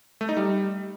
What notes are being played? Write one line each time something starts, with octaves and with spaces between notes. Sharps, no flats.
A3
D#4
G3